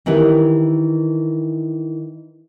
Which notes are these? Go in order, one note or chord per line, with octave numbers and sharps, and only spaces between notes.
D#3 E3 E4 G4 B4